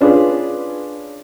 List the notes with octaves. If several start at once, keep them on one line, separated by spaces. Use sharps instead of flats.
C#4 D4 F4 G#4 B4